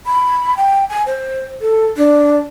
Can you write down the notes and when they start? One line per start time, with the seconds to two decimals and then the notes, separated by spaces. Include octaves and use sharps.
0.06 B5
0.57 G5
0.89 G#5
1.07 C5
1.61 A4
1.97 D4